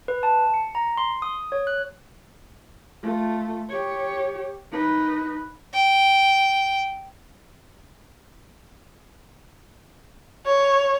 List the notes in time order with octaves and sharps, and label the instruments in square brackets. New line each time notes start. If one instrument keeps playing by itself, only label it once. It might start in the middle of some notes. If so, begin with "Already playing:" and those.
[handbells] B4
A5
C#7
A#5
C6
D#6
C#5
F#6
[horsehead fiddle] A3 F4
G4 C#5
D#4 B4
[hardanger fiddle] G5
[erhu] C#5